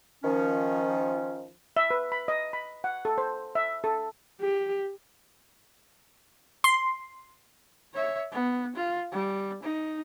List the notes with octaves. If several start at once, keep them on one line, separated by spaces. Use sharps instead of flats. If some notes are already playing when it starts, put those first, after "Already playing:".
D#3 F3 C#4
E5
B4
B5
D#5
B5
F#5
A4
C5
E5
A4
G4
C6
C#5 E5
B3
F4
G3
D#4